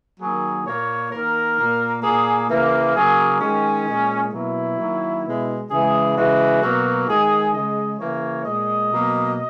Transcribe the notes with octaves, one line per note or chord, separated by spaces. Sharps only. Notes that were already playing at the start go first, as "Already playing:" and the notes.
D#3 F#3 A#3 G#4
A#2 A#3 C#5
D#3 A#3 A#4
A#2 A#3
A#2 A#3 G#4
C#3 E3 A#3
C#3 F#3 A#3 G#4
D#3 G#3 C#4
A#2 G#3
B2 F#3 A#3 E4
D#3 F#3 A#3
B2 G#3
C#3 E3 G#3 G#4
C#3 E3 G#3 F#4
B2 F#3 A#3
D#3 G#3 G#4
C#3 G#3 D#5
C#3 E3 A#3 C#5
A#2 G#3 D#5
B2 F#3 A#3